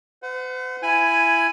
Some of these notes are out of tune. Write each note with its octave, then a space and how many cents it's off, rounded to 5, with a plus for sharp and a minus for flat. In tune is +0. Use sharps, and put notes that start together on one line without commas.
C5 -45 F#5 -10
E4 +20 G#5 +0 B5 +0